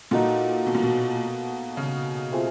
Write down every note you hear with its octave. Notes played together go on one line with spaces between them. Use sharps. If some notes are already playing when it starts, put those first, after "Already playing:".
A#2 A#3 D#4 F#4 A4
B2
A#2
B2
C#3
A3 C4 F4 G#4